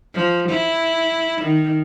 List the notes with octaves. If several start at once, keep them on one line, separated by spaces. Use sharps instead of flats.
F3
E4
D#3